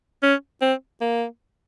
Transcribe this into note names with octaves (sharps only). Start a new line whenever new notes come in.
C#4
C4
A#3